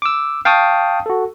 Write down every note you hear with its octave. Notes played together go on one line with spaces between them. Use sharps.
D6 E6
F5 G5 A5 C#6 D#6
F#4 A4